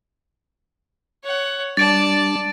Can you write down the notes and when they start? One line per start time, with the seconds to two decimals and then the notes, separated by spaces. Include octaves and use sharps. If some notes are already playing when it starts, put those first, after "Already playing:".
1.24 C#5 F#5
1.77 G3 D4 D5 A5 A6 D7